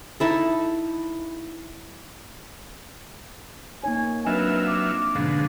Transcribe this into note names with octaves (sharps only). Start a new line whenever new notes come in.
D#4 E4 A4
A#3 D#4 C#5 G#5
F#3 C4 D4 F4 B4 D#5 E5
D6
G#2 B2 D3 F3 D4 F5